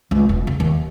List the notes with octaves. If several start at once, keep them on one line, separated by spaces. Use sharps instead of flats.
C#2 F3
E1
C#3
D#2